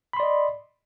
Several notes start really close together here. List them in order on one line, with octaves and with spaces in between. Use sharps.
B5 C6 D5 D#5